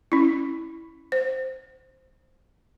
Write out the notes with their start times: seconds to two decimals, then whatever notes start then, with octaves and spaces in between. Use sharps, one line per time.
0.12 C#4 E4
1.12 C5